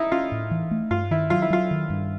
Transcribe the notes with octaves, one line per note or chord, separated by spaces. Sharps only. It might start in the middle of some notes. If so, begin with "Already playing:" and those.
Already playing: D#4 E4
C#4 F4
A2
E3
A3
G2 F4
D#3 E4
F#3 F4
E4
F#3 F4
D#3
G2